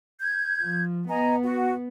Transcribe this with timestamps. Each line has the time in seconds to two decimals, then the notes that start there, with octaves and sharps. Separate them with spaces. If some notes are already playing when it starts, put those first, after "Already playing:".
0.20 G6 G#6
0.61 F3
1.08 B3 D#5 G#5 A#5
1.42 F#4 F#5